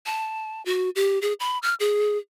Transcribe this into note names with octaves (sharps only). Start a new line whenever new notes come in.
A5
F#4
G4
G#4
B5
F6
G#4